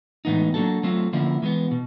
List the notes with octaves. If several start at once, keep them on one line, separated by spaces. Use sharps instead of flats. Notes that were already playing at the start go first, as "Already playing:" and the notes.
A2 E3 G#3 B3 D#4
F#3 A#3 D4 F#4 A4
F#3 A3 C4 F4
D3 F3 A#3 C#4 E4
E3 G#3 B3
B2